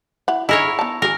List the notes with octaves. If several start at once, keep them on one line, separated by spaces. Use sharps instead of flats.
E4 F#5
D#4 E4 G#4 A#4 C#5
B3 A5
F#4 G#4 A#4